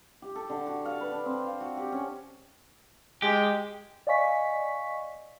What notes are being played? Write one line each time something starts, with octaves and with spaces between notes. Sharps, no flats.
G4
A4
D3
F#4
F5
B4
D4
C4
F5
F#4
G4
C#4
G#3 G4
D5 D#5 F5 G#5 C#6 B6